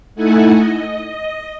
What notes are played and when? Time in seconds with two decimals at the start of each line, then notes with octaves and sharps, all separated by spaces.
0.15 A3 D#4 E4 A4 F#5 G#5
0.53 D#5
1.10 D#5